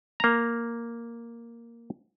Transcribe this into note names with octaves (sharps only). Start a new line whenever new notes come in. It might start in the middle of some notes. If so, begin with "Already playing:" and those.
A#3 A#5